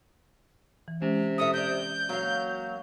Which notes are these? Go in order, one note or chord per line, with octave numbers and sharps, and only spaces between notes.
E3
C3 G#3 C#4
E4 A4 E5 D#6
C4 D5 G6
F#3 A#3 F5